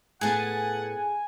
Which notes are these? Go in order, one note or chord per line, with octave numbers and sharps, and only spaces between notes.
A2 B3 G#4 F#5 G#5 A5